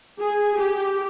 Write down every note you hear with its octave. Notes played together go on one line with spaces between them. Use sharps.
G#4
G4